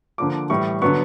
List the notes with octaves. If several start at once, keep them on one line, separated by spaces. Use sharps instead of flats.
D3 F3 A#3 D6
A2 E3 G3 C#6
D3 F#3 B3 C#6